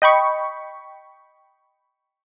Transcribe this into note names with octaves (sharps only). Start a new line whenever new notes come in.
D#5 G5 B5 C#6